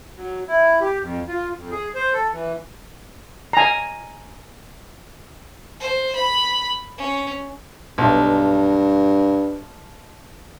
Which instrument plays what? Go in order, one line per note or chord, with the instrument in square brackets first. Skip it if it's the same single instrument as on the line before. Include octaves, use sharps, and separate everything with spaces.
[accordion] F#3
E4
G4
F2
F4
F2
G#4
C5
A4
E3
[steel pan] G#5 A#5
[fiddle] C5
B5
C#4
[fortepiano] B1 [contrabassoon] G2